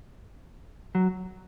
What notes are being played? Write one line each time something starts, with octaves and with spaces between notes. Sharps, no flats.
F#3